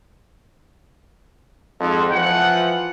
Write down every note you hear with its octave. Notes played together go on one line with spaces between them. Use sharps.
F2 G#2
E3 F3 F#5